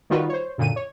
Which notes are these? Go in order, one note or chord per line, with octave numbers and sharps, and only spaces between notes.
D#3 G3 D#4 F4 F#4 B4
C5 C#5
F#2 A#2 D3 D#7
C#5